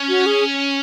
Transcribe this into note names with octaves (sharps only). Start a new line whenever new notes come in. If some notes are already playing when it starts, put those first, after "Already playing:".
Already playing: C#4
F#4
G#4